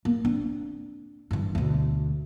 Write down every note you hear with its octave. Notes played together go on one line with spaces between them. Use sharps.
A#3
C4 D4
G2 E3
D2 B2